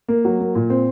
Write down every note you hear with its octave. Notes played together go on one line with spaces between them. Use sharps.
A#3
F#3
A#3
A#2
C4